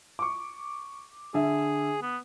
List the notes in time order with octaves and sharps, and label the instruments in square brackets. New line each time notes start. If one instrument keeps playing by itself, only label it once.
[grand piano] C#6 D6
[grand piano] D3 E5 [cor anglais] G#4
[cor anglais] B3